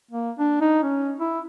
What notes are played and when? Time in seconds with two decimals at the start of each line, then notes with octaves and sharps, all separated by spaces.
0.11 A#3
0.39 D4
0.61 D#4
0.83 C#4
1.20 E4